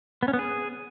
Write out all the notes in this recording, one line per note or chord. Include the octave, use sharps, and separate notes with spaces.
B3
C#4
B3
G#4